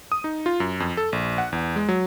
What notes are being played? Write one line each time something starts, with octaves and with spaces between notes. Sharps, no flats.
D#6
D#4
F4
F#2
F2
A4
A#1
F#5
E2
G#3
F#3